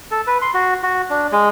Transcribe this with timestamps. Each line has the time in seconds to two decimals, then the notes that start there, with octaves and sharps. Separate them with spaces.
0.11 A4
0.27 B4
0.42 C6
0.54 F#4
0.83 F#4
1.10 D4
1.32 G#3